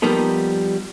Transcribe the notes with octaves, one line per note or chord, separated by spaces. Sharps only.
F3 G3 A#3 B3 D#4 A4